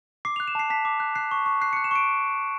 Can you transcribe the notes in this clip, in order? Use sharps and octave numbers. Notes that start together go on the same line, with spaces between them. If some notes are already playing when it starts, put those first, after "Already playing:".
D6 C7
F#6 F7
E7
A5 C7
A5 B6
D6
F#6
F#6 C7
C#6
C#6
F#6 C7
F#6 C#7
E7
C#6 D7